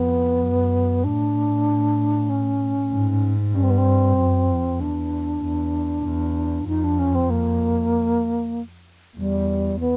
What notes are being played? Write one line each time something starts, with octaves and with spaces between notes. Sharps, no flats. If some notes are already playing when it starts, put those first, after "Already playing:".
Already playing: F2 B3
F#2
A2 D4
C#4
G#2
G2 C#4
C4
B3
C4
F#2
F2
E2 D4
E2
E2
F2 D#4
D4
C#4
C4
A#3
E2 G3
B3